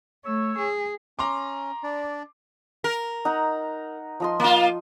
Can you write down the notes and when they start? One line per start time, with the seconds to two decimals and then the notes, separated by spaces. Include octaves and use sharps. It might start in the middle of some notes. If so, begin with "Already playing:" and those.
0.25 A3 C#5 E6
0.58 G#4
1.19 C#4 A#5 C6 D6
1.83 D4 D5
2.84 A#4
3.25 D#4 F#5 A#5
4.20 F3 D#5 C6
4.40 A#3 F4